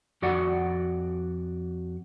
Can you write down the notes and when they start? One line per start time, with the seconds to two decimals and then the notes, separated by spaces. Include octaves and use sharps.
0.22 F2 F#4 D5 F#5